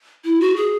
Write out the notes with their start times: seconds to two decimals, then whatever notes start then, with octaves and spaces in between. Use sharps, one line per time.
0.24 E4
0.41 F#4
0.56 G#4